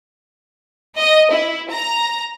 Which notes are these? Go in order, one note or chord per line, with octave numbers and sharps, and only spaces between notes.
D#5
E4
A#5